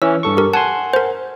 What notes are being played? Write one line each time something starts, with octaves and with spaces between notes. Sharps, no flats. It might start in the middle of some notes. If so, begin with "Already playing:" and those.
E3 C#4 E6
G2 A4 C#6
G4 A#4
F#5 G#5 A5 C6
A#4 C5